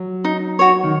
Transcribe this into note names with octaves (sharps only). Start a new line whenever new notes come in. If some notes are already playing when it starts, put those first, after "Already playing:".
Already playing: F#3
D#4
F#4 C#5
D#3